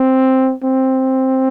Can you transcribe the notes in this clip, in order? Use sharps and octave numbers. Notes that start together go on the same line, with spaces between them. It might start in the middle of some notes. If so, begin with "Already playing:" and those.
Already playing: C4
C4